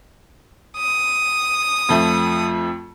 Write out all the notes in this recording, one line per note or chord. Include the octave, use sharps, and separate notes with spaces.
D#6
F2 F3 A3